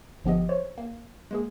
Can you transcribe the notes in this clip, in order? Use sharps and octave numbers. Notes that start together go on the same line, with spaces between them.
G1 F3 B3 G4 D#5
C5 C#5
A#3
G#3 A#3 G#4